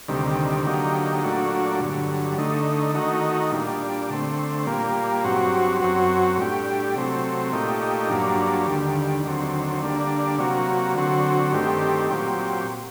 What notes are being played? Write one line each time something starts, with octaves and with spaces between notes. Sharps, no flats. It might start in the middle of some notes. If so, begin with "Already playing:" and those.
D2 C3 D#3 G3
D3 F#3 A#3 D#4 G4
A#2 F#3 A3 D4 F#4
G2 D3 F#3
D3 A3 D#4
D#3 A3 D#4 F#4
A#2 G3 D4
D3 A3 C4
A#2 G3 A#3
G2 F#3 C4 F#4
F#2 F#3 C4 F#4
A2 G3 D4 G4
C3 F#3 A3 C4
A#2 A3 D#4 G4
G2 F#3 A#3 D4
D#2 D3 G3
D#2 D3 F#3 C4
D3 G3 A#3 D4
C3 F#3 A#3 F#4
D3 F#3 C4 F#4
G2 D#3 A3 C4 G4
A#2 F#3 C4 G4